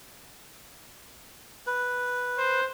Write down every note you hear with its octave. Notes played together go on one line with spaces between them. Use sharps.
B4
C5